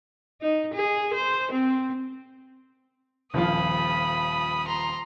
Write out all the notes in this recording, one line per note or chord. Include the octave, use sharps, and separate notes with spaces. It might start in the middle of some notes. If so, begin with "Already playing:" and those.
D#4
G#4
C5
C4
D#1 F3 F4 B5 D#6
A#5 C6